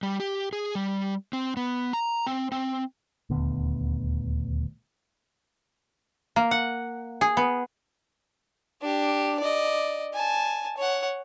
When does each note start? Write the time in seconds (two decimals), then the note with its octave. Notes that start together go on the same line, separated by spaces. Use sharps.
0.03 G3
0.20 G4
0.53 G#4
0.75 G3
1.33 C4
1.57 B3
1.93 A#5
2.27 C4
2.52 C4
3.30 D#1 D2 D3 B3
6.36 A#3
6.51 F#5
7.21 G#4
7.37 B3
8.81 D4 G4
9.39 D5 D#5
10.13 G#5 A5
10.77 C#5 F#5